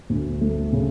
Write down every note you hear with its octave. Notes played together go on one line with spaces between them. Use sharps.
D2
A3
C#3